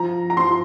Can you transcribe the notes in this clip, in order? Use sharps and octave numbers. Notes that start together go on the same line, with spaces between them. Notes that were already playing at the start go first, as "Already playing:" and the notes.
Already playing: F3 A#5
A#5
F3 C6